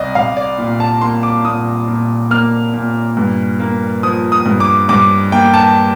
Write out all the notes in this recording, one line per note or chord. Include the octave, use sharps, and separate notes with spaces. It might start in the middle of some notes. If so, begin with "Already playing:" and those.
Already playing: C2 D5 D#5
C2 F5
D5
A#2
A5
A#3 C6
D6
A#2 D#6
A#2
A#3 F6
A#2
G2
A#3
F3 D#6
D#6
G2
D6
G2 D6
A#3 G5
A5